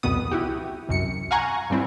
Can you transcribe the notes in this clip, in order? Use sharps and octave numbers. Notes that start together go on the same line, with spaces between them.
C2 F2 B2 B3 D#6
E4 F#4 G4
C2 F#2 C#7
F5 F#5 G#5 A#5 C#6
G2 G3 C4 E4